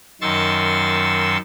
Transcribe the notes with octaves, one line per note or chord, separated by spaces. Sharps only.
F#2 D#3 C6 C#6 E6 A6